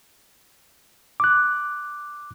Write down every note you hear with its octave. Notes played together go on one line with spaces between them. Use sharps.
D6 F#6